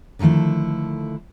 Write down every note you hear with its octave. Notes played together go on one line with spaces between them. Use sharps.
D3 D#3 F3 A3 E4